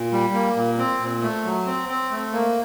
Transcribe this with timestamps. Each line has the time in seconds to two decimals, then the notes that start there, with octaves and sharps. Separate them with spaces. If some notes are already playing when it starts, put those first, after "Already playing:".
Already playing: A#2
0.12 G3
0.34 A#3
0.56 A#2
0.78 C4
1.00 A#2
1.22 A3
1.44 F#3
1.66 C4
1.89 C4
2.11 A3
2.33 A#3